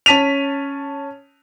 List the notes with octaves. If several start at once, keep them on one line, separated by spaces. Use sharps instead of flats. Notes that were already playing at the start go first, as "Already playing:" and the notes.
C#4 A5 B6 D#7 F7